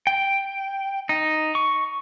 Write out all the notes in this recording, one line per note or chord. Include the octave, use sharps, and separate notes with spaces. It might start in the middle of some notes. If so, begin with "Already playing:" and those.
G5
D#4
C#6